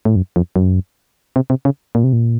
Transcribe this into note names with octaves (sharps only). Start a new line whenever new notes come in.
A2
F#2
F2
F#2
C3
C3
C#3
A#2
C3
A#2